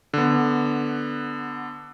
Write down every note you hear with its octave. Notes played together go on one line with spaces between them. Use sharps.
D3 B3